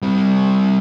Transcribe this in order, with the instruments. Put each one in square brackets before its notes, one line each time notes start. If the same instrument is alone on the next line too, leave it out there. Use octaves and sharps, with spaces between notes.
[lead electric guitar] G3 C4